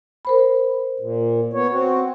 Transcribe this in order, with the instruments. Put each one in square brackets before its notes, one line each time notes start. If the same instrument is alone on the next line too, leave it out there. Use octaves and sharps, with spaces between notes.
[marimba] A#4 C5 B5
[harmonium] A#2
B3 C#5
C4 F#4